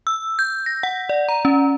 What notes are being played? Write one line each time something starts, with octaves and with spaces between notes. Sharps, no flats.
E6
G6
A#6
F#5
D5
A#5
C#4